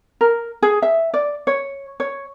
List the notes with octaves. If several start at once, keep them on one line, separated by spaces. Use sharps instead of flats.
A#4
G#4
E5
D5
C#5
C#5